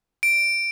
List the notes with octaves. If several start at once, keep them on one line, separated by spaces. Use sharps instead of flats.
D7